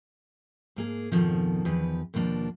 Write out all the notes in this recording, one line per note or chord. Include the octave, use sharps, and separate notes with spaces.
G#2 A#3 G#4
F2 G#2 B2 D#3 F3
E2 D#3 F3 B4
D#2 B2 F3 A#3 D4